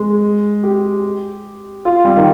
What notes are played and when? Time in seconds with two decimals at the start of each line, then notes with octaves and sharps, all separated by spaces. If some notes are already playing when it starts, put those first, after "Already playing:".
Already playing: G#3
0.63 G4
1.85 F4
2.05 G3
2.17 D#3